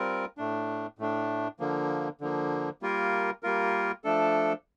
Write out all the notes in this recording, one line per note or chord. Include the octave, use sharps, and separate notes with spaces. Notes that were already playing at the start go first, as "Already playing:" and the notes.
Already playing: G3 C4 F4 A#4
A2 A3 D4
A2 A3 D4
D3 F3 A#3
D3 F3 A#3
G3 A#3 F4 A#4
G3 A#3 F4 A#4
F3 A3 D4 A4